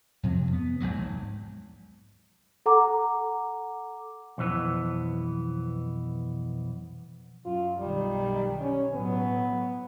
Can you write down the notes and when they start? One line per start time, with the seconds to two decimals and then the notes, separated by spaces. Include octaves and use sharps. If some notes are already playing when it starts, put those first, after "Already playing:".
0.23 F2 C3 F3 F#3
0.53 B3
0.80 A#1 F2 G#2 F#3
2.66 A4 F#5 A#5 D6
4.38 B1 F2 E3 B3
7.45 F#2 F4
7.78 B1 D#3 G3
8.61 C#4
8.93 A2 F#3 B3